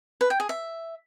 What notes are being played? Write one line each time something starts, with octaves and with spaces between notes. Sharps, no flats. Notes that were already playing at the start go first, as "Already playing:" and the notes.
B4
G5
G#4
E5